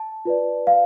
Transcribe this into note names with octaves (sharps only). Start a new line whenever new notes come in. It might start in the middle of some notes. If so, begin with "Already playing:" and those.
Already playing: A5
F4 B4 D5
F5